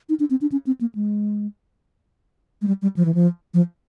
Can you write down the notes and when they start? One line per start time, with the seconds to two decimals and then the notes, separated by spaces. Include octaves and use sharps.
0.09 D#4
0.20 D4
0.30 C4
0.41 D4
0.52 C#4
0.67 C4
0.81 A#3
0.95 G#3
2.62 G#3
2.67 G3
2.82 G3
2.97 F3
3.05 E3
3.14 F3
3.54 F3